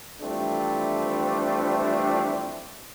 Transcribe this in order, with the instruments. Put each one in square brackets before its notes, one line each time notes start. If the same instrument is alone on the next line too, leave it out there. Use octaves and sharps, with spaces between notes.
[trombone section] E3 F3 G3 A3 C4 D4